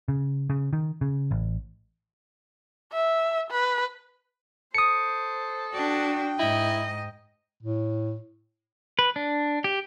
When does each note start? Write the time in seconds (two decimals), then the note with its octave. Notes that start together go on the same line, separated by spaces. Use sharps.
0.08 C#3
0.50 C#3
0.73 D#3
1.01 C#3
1.31 A1
2.92 E5
3.51 B4
4.75 A4 C5 D#6 C#7
5.74 D4 F#4 G5
6.39 G#2 E4 D#5
7.63 A2
8.99 B4
9.16 D4
9.64 G4